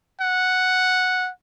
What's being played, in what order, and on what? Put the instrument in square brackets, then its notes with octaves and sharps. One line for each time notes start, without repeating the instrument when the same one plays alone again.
[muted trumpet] F#5